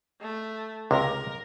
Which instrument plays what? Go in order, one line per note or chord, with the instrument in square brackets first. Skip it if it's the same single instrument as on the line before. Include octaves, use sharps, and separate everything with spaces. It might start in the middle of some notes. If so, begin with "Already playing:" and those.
[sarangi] A3
[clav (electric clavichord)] C#2 C3 [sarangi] A#4